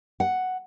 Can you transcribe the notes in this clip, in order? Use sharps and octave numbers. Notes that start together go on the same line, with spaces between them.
F#5